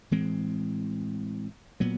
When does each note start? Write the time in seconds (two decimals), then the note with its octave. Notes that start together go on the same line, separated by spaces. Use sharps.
0.11 A2 E3 G#3 C4
1.80 A#2 F#3 B3